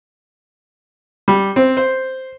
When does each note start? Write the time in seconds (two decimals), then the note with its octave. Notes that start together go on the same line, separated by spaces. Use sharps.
1.28 G3
1.56 C4
1.77 C5